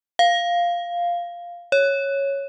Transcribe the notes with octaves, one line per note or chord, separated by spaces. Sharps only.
F5
C#5